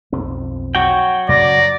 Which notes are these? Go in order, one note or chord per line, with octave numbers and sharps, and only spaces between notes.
B1 F2 C4
F#3 F#4 G5
F#2 C#3 D5 A#6